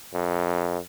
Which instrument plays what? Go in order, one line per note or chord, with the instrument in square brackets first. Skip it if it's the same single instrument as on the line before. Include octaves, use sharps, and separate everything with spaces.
[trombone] F2